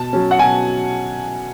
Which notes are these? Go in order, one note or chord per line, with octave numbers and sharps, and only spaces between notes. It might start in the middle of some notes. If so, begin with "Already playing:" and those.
Already playing: B2 A5
F#3 C#4
F#5
B2 G#5